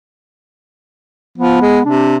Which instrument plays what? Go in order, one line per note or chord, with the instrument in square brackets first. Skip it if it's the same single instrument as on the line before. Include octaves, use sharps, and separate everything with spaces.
[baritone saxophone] F3 [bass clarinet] B3
[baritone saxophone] G#3
[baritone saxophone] C3 [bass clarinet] D4